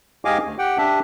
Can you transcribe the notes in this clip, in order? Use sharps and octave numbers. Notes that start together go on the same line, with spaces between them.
G#2 G4 D#5 F5 G#5 D6
D2
G4 F#5 G5
D4 G4 E5